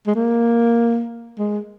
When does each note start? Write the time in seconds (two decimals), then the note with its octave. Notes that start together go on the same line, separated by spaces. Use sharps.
0.07 G#3
0.15 A#3
1.39 G#3